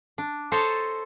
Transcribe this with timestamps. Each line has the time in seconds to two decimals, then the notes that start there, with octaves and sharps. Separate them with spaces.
0.18 D4
0.52 A4 C5 C#5 D#5 A5 A#5